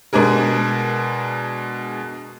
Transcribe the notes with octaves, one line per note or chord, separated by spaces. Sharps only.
B2 G#3 D4 G#4 A#4